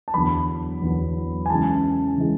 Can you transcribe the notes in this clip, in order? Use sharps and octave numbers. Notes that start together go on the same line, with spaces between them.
A5
E2 D3 F#3 B3 B5
E2 D3 F#3 B3
G#5
C#3 E3 G#3 A5
C#3 E3 G#3